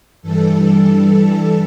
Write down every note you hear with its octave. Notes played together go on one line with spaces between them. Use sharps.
G2 E3 G3 A4